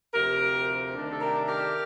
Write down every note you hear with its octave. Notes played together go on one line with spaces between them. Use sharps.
D2 C3 F3 G4 A#4
C3 D#3 A3 D4
A4
G4 A#4
G4 A#4